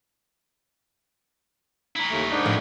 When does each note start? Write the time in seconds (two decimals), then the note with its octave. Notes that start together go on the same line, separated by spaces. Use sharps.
1.96 E4 A#4
2.10 D#2 A3
2.30 G#2 D4 D#4
2.45 A2 F3 C4